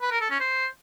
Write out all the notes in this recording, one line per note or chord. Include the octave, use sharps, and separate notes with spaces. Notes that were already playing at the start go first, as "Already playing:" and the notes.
B4
A#4
A4
C#4
C5